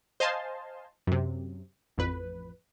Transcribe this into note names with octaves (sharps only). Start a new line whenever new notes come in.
C5 D#5 F5 G#5 A5 C6
F#2 C3
A1 F2 B4